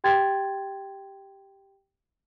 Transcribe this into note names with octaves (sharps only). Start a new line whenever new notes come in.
G4 G5 C6 G#6 A6